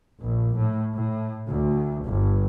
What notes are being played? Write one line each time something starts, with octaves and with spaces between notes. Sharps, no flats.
A#1
A2
A2
D2
G1